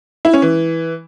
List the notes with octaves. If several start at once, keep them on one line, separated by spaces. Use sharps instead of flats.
E4
C#4
E3